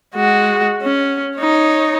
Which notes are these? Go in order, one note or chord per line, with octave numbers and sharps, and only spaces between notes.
G#3 F#4
C#4
D#4 C#5